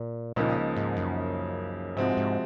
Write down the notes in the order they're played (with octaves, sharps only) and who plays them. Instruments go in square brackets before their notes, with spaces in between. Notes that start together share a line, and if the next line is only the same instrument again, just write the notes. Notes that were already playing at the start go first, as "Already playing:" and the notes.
Already playing: [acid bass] A#2
[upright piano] C#2 C#3 F3 A#3 D#4 [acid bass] A#2
[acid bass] G#2
F#2
[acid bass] G#2 [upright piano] C3 F3 G#3 C4 F#4
[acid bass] G#2